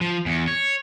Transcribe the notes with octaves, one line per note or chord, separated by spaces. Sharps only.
F3
E2
C#5